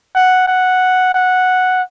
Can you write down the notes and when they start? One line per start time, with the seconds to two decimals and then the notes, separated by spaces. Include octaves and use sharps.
0.15 F#5
0.47 F#5
1.14 F#5